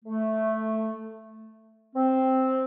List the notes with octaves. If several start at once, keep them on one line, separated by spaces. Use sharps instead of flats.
A3
C4